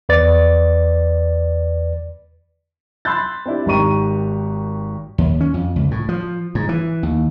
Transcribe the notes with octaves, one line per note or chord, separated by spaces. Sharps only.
E2 B4 D5 A6
B5 C6 E6 F#6 G6 A6
C4 D4 E4 G4
G#1 D#3 G4 A#5 C#6 D#7
D#2
C#4
F2
C#2
A2
F3
G#2
E3
D#2